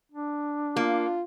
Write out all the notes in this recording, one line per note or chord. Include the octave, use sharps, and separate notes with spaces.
D4
A#3 F4